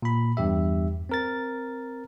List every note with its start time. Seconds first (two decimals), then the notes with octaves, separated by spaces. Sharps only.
0.02 A#2 B5
0.37 E2 G2 G4 E5
1.09 C4 A#4 A6